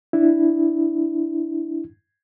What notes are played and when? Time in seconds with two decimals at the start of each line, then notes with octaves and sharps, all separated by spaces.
0.13 D4 E4